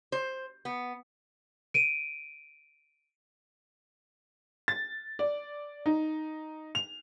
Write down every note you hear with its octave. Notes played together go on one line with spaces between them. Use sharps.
C5
B3
D7 D#7
A6
D5
D#4
F7